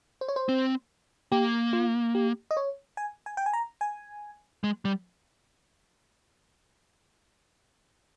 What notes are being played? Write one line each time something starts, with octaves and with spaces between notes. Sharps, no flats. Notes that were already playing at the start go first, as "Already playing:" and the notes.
C5
C#5
C5
C4
A#3 G4
F4
G4
D#5
C#5
G#5
G#5
G5
G#5
A#5
G#5
G#3
G3